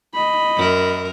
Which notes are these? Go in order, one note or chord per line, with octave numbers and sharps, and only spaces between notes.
D#5 B5
F#2 A#4